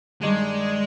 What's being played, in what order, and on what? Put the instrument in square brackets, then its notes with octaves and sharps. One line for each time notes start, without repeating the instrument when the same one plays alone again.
[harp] G2 D#3 G3 [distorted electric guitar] G#3